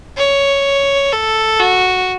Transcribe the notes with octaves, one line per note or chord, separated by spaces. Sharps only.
C#5
A4
F#4